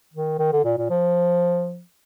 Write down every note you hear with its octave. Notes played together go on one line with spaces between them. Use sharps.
D#3
D#3
D3
A#2
A#2
F3